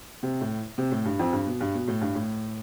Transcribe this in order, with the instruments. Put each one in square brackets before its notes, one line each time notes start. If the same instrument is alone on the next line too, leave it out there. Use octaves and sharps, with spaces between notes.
[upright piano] C3
A2
C3
A2
G2
F2
G2
B2
G2
B2
A2
G2
A2